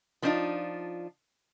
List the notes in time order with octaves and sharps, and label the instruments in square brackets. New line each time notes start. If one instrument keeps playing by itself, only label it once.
[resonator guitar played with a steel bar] F3 A#3 C4 D4 D#4 F4